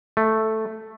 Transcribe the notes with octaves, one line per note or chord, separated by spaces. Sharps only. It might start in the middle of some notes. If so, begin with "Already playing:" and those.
A3